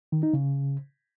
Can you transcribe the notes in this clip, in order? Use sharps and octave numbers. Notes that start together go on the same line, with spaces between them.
D#3
D#4
C#3